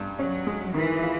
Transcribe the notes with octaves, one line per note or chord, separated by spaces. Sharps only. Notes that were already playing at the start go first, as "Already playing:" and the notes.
Already playing: G2
F#3 C#4
G#3
D#3 E3
F4